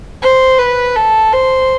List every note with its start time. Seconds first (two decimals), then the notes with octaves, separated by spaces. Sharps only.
0.22 C5
0.59 B4
0.96 A4
1.33 C5